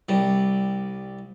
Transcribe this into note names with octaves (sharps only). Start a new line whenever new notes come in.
C2 G3